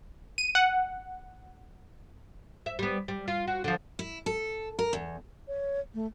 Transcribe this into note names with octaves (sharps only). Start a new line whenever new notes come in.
D#7
F#5
E5
G3 B3
G3
F4
F#4
D3 F3
E4
A4
A#4
E2
C#5
A3